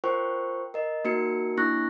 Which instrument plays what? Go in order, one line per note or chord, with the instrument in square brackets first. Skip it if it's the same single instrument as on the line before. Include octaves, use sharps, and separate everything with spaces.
[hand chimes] F4 A#4 C5 G5 C#6
A#4 D#5
A#3 D#4 F#4 A#4 C#7
A#3 D4 E4 C#6 F#6 A#6